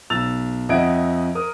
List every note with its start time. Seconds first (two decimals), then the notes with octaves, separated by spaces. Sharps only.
0.10 B1 E6 A6 F7
0.69 F2 D#5 E5 F#5 G#6 D7
1.35 A#4 D#6